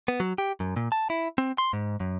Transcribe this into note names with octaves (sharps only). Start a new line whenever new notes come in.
B3
F#3
G4
F#2
A#2
A5
E4
C4
C6
G#2
F#2